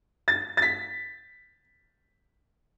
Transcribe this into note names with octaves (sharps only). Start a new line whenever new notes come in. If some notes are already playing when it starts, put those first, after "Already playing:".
A6
A6
B6